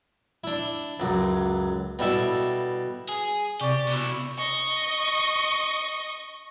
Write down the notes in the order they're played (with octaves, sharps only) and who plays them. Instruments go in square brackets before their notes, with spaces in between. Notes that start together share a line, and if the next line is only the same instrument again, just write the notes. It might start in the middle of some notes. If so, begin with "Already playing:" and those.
[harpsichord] D4 E4
C#2 F#2
B2 G3 E4 A4 E5
[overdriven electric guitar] G#4
[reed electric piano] C3 [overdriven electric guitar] G4 [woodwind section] D5 [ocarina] C#6
[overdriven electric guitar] B2 E4
[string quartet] D#5 C#6